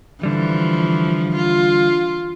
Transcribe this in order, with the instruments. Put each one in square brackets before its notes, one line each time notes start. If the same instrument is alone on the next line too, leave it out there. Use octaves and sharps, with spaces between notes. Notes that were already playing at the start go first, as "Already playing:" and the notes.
[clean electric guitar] D3 G3 [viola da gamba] E3 F3
[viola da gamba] F4